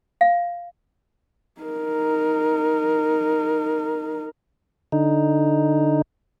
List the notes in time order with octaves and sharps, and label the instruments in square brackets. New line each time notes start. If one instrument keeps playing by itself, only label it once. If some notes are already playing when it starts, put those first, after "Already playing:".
[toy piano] F5
[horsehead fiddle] D#4 A#4
[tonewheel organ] D3 D#4